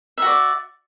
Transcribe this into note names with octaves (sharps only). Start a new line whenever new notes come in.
F#4 D5 E5